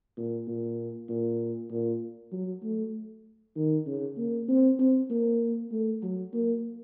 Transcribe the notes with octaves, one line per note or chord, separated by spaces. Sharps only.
A#2
A#2
A#2
A#2
F#3
A3
D#3
C#3
A#3
C4
C4
A#3
A3
F#3
A#3